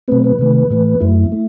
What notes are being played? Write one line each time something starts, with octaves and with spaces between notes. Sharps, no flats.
B2 F#3 A3 C4 B4
B4
C3 D#3 A3
A2 E3 A3
F#2 F#3 A3 E4
A3